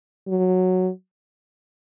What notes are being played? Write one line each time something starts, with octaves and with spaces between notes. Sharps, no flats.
F#3